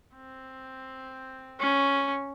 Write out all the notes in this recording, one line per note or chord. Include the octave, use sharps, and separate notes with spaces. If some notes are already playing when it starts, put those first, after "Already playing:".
C4
C#4